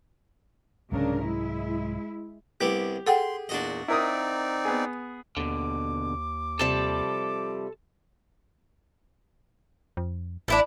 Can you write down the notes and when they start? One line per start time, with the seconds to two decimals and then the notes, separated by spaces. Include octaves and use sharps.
0.92 C2 G#2 C#3 F#3 D4 A#4
1.22 G#3 E4
2.60 C2 B3 G4 D6
3.07 G#4 A4 F#5 G5 C6
3.49 E2 A#2 D4 F#4 D#5
3.88 C4 D#4 E4 A#4 D5 D#6
4.65 B3 G#4
5.37 D#2 B2 D3 D6
6.59 C3 F3 G3 A4 A5
9.97 F2
10.48 A1 D4 E4 A4